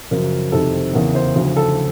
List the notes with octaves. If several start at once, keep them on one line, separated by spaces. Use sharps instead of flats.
F#2 C#3 F3 A#4
F2 C3 D#3 A4
E2 C#3 E3 A#4
C5
D2 C#3 F3
A4